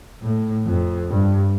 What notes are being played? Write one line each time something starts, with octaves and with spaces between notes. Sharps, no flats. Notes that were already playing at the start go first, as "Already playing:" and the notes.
A2
F2
G2